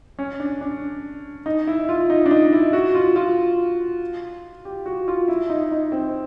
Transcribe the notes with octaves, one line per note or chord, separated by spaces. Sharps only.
C#4
D4
D4
D#4
E4
F4
D#4
D4
D#4
E4
F#4
F4
F4
G4
F#4
F4
E4
D#4
D#4
C4